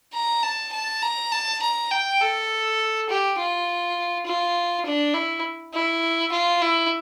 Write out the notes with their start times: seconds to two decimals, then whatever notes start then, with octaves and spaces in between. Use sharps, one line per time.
0.14 A#5
0.43 A5
0.72 A5
1.02 A#5
1.31 A5
1.62 A#5
1.91 G5
2.20 A4
3.09 G4
3.38 F4
4.26 F4
4.85 D4
5.14 E4
5.74 E4
6.32 F4
6.62 E4